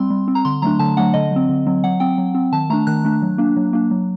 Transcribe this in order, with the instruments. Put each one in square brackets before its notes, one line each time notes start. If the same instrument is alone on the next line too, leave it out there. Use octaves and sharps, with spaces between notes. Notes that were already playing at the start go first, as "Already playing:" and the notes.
Already playing: [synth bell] G3 C4 C6
G3
C4
A#5
D3 C6
F#3 A3 D4 A#5
D3 A5
F#3 A3 D4 F#5
D3 D#5
F#3 C4
D3
F#3 C4
F#3 F#5
C4 G5
F#3
C4
D#3 A5
A3 D4 A#5
D#3 F#6
A3 D4
F#3
A#3 D4
F#3
A#3 D4
F#3